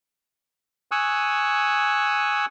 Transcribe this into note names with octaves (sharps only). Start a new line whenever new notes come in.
G#5 C#6 D#6 E6 F#6